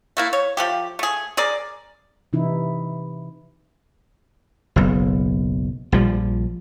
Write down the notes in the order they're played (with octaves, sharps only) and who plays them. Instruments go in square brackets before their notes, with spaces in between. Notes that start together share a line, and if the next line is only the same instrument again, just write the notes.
[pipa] A3 A#3 E4
C#5
F3 A3 G4
A3 G#4
G#4 A#4 D5
[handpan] C3 E3 D#4 E4
[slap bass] F#1 B1
A#1 F3 G3